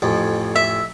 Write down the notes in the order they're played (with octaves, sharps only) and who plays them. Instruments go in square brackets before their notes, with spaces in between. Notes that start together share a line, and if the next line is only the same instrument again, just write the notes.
[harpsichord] A1 F2
[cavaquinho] E5